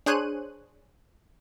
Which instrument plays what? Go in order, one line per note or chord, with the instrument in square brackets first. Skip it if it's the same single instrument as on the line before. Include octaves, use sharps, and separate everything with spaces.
[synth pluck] D4 G#4 C5 C#5 F#6 D#7